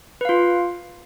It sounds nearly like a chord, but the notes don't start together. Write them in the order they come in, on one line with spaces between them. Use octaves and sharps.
B4 F5 F4